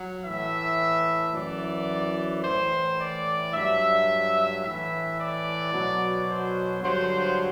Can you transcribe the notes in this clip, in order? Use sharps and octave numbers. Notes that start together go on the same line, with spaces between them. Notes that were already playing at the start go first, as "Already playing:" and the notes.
Already playing: F#3
A2 E3 E5
F#2 E3 D5
A2 E3 C5
D5
G2 F#3 E5
A2 E3 E5
D5
B2 F#3
C5
G2 D3 F#3 C5